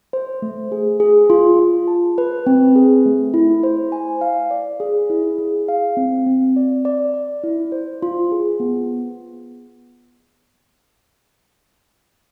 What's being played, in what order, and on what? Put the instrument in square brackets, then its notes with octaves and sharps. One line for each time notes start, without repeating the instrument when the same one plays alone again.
[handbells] C5
A3
G#4
G#4
F4
F4
A5
B4
C4
G#4
A3
E4
C5
G#5
F5
D5
G#4
E4
G#4
F5
C4
C4
D5
D5
D5
E4
C5
F4
G#4
B3